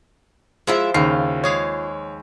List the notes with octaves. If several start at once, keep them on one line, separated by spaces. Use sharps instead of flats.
F3 G#3 E4 F4 E5
D#2 C#3 F4 C7
G#3 G#4 C#5 F5